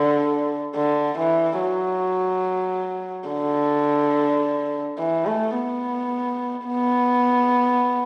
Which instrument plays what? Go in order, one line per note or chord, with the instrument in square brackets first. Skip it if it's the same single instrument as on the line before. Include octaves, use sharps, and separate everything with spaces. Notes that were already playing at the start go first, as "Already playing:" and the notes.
Already playing: [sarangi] D3
D3
E3
F#3
D3
E3
A3
B3
B3